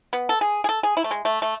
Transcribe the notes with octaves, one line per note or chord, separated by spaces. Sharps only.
B3
A4
G#4
G#4
A4
G#4
E4
A3
G#3
A3
A3